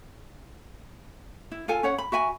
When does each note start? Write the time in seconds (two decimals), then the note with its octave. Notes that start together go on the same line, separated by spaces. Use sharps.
1.52 E4
1.68 F4 A4 G#5
1.83 C#4 C#5 F#5
1.98 B5
2.12 F#4 E5 G#5 B5